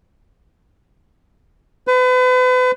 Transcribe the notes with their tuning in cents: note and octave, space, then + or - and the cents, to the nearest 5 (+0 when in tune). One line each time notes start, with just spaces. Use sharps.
B4 +40